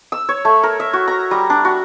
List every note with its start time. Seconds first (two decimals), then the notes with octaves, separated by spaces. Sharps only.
0.12 E6
0.29 C#5
0.45 A3
0.63 A#4
0.80 E5
0.93 F#4
1.08 A#5
1.31 G3
1.50 D4
1.65 F#4